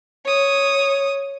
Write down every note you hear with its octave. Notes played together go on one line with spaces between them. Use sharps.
C#5 D#6